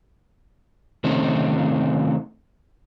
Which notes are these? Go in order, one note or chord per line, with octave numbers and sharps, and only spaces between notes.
C3 D#3 A3 C4 C#4